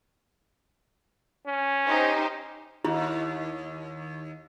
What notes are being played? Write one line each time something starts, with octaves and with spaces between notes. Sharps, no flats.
C#4
D#4 G4 C5
D#2 E4